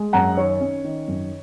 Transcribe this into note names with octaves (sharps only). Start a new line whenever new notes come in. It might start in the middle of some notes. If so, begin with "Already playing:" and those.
Already playing: G#3
F#2 F#5 A#5
D#3 C#5
C#4
D#3
F#2